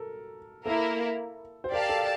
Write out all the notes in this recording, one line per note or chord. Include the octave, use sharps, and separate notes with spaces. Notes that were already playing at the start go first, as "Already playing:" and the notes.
Already playing: A4 A#4
A#3 E4 A4 A#4
C5
G4 A#4 D5 F5 A5
A4